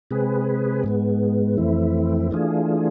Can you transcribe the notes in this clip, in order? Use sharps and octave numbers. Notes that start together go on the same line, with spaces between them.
C3 G#3 C4 G#4 B4
G#2 G#3 B3
F2 E3 A3 C4 E4
E3 A3 D4 F4 G#4